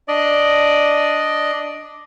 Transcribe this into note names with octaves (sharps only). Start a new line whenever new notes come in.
D4 D5 D#5